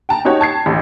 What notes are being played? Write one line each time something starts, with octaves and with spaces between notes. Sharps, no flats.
G5 A5 A#5
C#4 D#4 F#4 G4 C#5
A5 G#6 C7
A1 D2